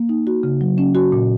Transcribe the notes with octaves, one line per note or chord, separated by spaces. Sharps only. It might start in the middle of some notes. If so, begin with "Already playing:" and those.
Already playing: A#3
D#4
F#4
C#3
F#3
C#4
F#4
A#2